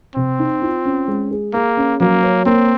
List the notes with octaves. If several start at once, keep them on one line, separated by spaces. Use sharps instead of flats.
C3 C4
D#4
F4
C#4
G#3
G#4
A#3 G#4
C#4
F#3 A#3
C#5
A#3 C4